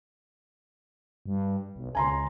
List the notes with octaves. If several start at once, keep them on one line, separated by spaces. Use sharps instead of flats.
G2
B1
C#2 G#5 A#5 C6